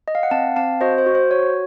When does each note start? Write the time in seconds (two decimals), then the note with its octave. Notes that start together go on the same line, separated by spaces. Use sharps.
0.08 D#5
0.15 F5
0.23 F#5
0.31 C4 F5 A5
0.56 C4 F5 A5
0.81 F#4 C5 D#5
0.98 C5
1.06 F#4
1.15 C5
1.31 F#4 C#5